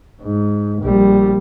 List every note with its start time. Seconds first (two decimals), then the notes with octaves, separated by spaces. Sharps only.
0.21 G#2
0.82 A#1 G3